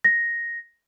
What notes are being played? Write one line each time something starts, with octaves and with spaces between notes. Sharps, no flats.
A#6